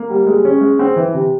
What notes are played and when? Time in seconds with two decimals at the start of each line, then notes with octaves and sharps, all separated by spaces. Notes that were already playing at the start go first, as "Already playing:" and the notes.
Already playing: A#3
0.10 G3
0.26 G#3
0.45 C#4
0.61 G#3
0.79 C4
0.96 E3
1.14 C3